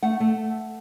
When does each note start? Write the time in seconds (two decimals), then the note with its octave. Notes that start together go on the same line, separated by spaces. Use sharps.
0.03 A3 F#5
0.20 A3